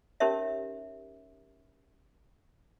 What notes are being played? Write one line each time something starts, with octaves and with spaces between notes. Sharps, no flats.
C#4 D#4 G4 A#4 C#5 E5